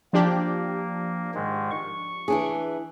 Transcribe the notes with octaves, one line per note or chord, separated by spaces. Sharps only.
F3 A#3 D4 G4
G#2 D#3 G#3
C#6
E3 D4 G#4